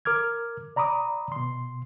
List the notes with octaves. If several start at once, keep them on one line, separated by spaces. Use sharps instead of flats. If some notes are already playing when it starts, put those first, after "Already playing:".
A#4 D6 F6 G#6
D5 A#5 B5 D6 D#6
B2 C6